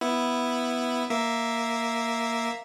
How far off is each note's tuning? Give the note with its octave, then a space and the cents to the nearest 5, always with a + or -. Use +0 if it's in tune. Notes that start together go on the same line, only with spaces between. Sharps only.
B3 +0 E4 +0
A#3 +0 E5 +0